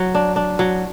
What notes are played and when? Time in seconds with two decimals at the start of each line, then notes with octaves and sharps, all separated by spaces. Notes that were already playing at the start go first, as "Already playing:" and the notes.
Already playing: F#3
0.15 D4
0.36 D4
0.59 F#3